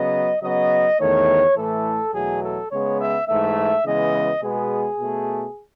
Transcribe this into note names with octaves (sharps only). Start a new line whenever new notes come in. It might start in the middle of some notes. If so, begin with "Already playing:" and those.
Already playing: C#3 F#3 B3 D#5
C#3 F#3 B3 D#5
E2 D#3 A3 C#5
A2 E3 A3 A4
E2 B2 F#3 A3 G#4
A4
C#3 G#3 B3 C#5
E5
G#2 E3 A3 E5
C#3 E3 G#3 B3 D#5
B2 G#3 B3 G#4
B2 A3